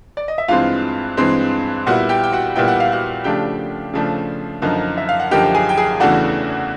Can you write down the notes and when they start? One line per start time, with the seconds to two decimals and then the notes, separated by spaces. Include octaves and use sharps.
0.17 D5
0.28 D#5
0.38 E5
0.48 G2 E3 G#3 C4 F4 F5
1.17 G2 E3 G#3 C4
1.87 A#2 G3 B3 E4 F#4 F#5
2.09 G4 G5
2.24 G5
2.32 F#4 F#5
2.56 A#2 G3 B3 E4 G5
2.68 F#5
2.80 F5
2.92 F#4 F#5
3.24 C#3 F3 A3 D4 G4 G5
3.94 C#3 F3 A3 D4
4.62 F#2 D3 F3 A#3 D#4
4.97 E5
5.09 F5
5.19 F#5
5.31 F#2 D3 F3 A#3 D#4 G4 G5
5.54 G#4 G#5
5.69 G5
5.77 G#4 G#5
6.00 E2 C#3 E3 A3 D4 F#4 F#5